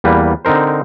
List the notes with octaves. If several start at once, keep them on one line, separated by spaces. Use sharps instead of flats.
E2 G3 A#3 B4
D3 C4 D#4 A#4 C5